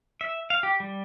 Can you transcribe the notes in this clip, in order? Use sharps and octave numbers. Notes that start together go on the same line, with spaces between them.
E5
F5
G4
G3